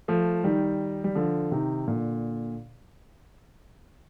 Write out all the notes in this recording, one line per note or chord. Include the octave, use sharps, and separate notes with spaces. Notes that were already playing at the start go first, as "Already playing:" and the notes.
F3 A3
D#3 G3
G3
D3 F3
C3 D#3
A#2 D3